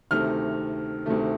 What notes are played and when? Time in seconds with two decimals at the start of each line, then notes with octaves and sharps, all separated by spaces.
0.11 D2 C3 D#3 A3 F6
1.06 D2 C3 D#3 A3